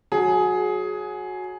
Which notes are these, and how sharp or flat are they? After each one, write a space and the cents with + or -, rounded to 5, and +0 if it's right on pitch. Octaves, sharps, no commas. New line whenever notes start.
F#3 -10 G#4 +15